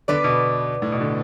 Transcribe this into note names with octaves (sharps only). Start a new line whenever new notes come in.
D3 B3 D4 B4 D5
B2
A2
B2
D3